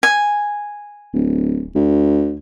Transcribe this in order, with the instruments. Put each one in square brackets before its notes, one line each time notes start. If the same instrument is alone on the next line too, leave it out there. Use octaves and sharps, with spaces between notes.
[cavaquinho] G#5
[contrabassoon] D1
D2